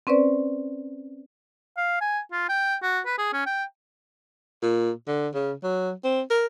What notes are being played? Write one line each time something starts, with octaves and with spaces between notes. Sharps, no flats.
C4 C#4 B4 C5 D5
F5
G#5
F4
G5
F#4
B4
G#4
C#4
G5
A#2
D3
C#3
F#3
C4
A#4